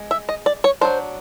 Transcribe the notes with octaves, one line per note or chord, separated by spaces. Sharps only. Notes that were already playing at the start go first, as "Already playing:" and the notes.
Already playing: G#3
E5
D#5
D5
C#5
F#3 A#3 D4 C5